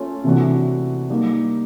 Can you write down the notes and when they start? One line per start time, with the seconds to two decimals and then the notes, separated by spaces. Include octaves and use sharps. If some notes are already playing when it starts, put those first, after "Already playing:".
Already playing: A3 C#4 F4
0.24 C3 E3 A3 D4 F#4
1.10 G3 A#3 D#4